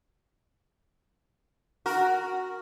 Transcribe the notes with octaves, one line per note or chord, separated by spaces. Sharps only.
F#4 A#4